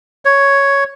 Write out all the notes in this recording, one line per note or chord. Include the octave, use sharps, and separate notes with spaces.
C#5